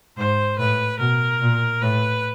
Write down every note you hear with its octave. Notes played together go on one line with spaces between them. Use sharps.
G#2 C5
A2 B4
B2 A#4
A#2
A2 B4